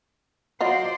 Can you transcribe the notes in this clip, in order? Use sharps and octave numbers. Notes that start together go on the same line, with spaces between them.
F#3 F4 C5 D5 D#5